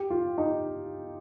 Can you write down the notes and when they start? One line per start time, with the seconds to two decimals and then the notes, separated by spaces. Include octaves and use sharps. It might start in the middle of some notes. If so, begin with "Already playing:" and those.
Already playing: G4
0.10 F4
0.38 D#4